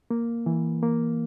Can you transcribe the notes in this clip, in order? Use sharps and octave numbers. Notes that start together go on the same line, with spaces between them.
A#3
E3
A#3